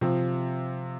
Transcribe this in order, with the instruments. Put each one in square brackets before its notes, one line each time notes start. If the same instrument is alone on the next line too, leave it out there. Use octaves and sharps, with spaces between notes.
[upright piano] C3 F3 C4